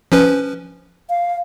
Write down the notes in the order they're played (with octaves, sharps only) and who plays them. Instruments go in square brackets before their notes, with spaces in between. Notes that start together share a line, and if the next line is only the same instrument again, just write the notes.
[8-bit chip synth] F3 C#4 B4
[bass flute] F5